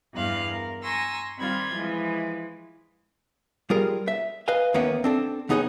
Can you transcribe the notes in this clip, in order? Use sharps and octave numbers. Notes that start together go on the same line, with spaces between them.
E2 G2 D5 F5 F#6
A#4
G#5 A#5 C6 C#6 E6 A#6
D#3 G3 C4 F4 B5 G#6
E3 F3 G#3
G3 F4 G#4 A#4
E5
B4 D#5 F5 G#5
D#2 A#3 B3 C#4 E5 F#5
C4 D4 A4
D#2 B3 D#4 G#4 C#5 G5